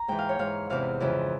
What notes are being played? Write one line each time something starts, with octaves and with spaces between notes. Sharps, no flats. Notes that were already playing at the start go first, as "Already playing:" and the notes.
Already playing: A#5
G#2 E3 G5
F5
C#5
G#2 E3 F5
E2 C3 E3 F5
F2 C#3 E3